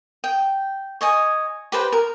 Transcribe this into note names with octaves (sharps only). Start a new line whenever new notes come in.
G5
C#5 D#5 G#5
G4 B4 C5 G5
A#4